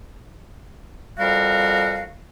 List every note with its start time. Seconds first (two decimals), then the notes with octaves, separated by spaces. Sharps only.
1.19 F2 G3 F#4 A#4 F5